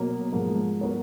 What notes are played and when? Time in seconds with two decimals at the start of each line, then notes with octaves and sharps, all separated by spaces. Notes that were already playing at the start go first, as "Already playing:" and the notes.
Already playing: B2 F#3 A#3
0.32 G#2 F3 A#3
0.81 F#3 B3 A#4 C#5